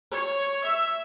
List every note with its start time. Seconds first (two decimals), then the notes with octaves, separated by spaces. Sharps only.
0.12 C#5
0.64 E5